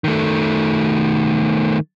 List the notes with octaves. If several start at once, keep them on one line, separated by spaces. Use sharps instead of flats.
D#3 A3